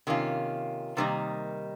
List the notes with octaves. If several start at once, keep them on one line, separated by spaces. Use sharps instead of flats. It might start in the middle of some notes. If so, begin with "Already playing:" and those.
C3 D#3 A#3 C#4 F4
C3 D#3 G3 A#3 D#4